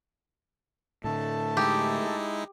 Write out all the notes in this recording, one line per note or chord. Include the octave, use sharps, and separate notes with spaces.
A2 D3 A3 A4 A5
G#3 D#4 E4 G4